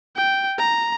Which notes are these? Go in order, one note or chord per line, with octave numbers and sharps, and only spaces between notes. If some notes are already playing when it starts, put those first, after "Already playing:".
G5
A#5